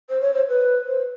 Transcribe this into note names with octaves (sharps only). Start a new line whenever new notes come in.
C5
C#5
C5
B4
C5